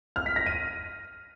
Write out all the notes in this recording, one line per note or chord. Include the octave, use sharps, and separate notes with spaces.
F6
B6
A#6
D#7